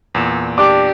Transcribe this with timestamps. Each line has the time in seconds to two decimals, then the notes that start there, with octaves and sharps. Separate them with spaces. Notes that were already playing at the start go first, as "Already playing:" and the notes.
0.15 E2 A#2 E7
0.58 D4 G4 D6